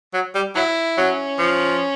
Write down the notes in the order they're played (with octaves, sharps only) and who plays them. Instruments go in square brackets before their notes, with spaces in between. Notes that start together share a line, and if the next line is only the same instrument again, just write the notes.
[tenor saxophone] F#3
G3
[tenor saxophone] F#3 [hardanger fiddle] E4
[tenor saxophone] F#3 [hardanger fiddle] C#4
[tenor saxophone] F3